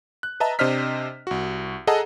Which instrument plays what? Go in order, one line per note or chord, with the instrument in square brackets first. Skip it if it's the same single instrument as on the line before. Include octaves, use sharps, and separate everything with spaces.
[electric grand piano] F#6
B4 D#5 E5 A5 A#5
C3 D4 C5 D#5 F6 B6
C2 F#4
G#4 A4 D#5 F#5 A5 A#5